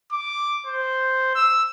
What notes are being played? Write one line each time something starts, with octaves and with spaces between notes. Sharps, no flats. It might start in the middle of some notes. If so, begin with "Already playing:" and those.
D6
C5
E6